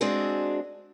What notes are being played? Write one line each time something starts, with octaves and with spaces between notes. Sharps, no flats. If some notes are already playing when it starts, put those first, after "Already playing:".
G#3 C4 D4 F#4 G#4